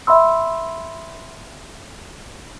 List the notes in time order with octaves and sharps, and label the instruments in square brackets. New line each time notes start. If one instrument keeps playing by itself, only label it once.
[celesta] E5 B5 C6 E6